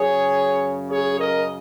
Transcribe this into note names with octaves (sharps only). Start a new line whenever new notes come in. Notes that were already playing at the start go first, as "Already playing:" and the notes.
Already playing: F#2 C#3 G#4 C#5
G#4 C#5
A#4 D#5